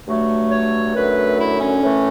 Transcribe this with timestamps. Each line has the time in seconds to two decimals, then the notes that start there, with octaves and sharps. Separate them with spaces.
0.08 G2 F#3 A3
0.52 C#5
0.95 F#2 D3 A3 B4
1.39 E4
1.61 C#4
1.83 A2 E3 A3